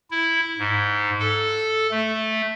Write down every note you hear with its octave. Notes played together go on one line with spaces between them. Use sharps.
E4
G#2
A4
A3